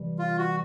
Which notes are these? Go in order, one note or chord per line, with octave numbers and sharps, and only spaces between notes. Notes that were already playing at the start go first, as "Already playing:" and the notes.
Already playing: C3 E3 G3
F4
F#4